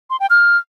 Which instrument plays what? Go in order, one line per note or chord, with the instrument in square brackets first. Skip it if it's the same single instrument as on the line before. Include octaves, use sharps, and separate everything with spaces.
[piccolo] C6
G5
F6